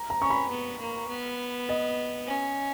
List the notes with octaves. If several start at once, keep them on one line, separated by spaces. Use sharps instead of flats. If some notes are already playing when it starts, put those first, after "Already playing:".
Already playing: A#5
A#5
C#4 C#6
B5
B3
A#3
B3
D#5
C#4